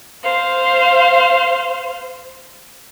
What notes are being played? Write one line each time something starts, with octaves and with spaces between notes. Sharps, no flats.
C5 F5